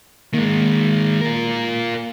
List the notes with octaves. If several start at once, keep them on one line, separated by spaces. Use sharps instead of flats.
D#3 G#3 A#3
F4 A#4